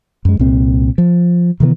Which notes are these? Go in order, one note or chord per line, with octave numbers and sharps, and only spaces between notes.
F#2 G#3
C2 A#2 C4
F3
C3 D#3 E3 B3